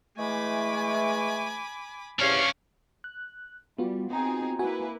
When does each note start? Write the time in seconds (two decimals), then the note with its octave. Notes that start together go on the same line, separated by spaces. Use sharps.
0.17 E3 G#3 A3 G#5 B5 D6
2.19 E2 C3 F3 C#4 D4 F5 C#6
3.04 F#6
3.78 G3 B3 F4 F#4
4.11 C4 D#4 G#4
4.59 A#3 E4 F#4 B4 G#5